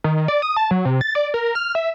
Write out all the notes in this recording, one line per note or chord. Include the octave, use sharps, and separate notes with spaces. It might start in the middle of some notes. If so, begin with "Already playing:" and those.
D#3
D5
D#6
A5
F#3
C3
A6
D5
A#4
F6
E5